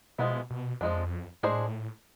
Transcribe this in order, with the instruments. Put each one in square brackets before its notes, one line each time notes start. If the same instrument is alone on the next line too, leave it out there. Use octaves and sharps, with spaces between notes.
[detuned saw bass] B2 [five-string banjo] F3 G#3 B3 E4
[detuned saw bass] B2
[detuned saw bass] F2 [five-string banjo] F3 G#3 D4
[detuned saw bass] A2 [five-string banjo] G#3 D4 G#4 C5